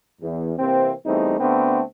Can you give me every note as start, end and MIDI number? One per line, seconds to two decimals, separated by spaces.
0.21 0.52 40
0.58 0.91 48
0.58 0.91 52
0.58 0.91 58
0.58 0.91 60
1.06 1.37 40
1.06 1.37 55
1.06 1.37 57
1.06 1.37 60
1.06 1.37 63
1.40 1.81 38
1.40 1.81 50
1.40 1.81 57
1.40 1.81 59
1.40 1.81 60